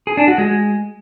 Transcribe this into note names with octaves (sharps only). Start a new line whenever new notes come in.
G#4
D4
F#4
G#3